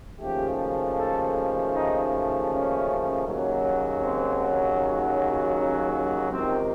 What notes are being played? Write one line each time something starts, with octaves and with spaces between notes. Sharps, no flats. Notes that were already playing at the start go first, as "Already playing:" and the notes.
D#2 C#3 F3 A3 G4
A4
D#4
C#4
D#2 C#3 F#3
C4
C#4
C#2 C3 D#3 C4